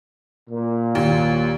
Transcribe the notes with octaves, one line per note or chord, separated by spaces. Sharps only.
A#2
D#2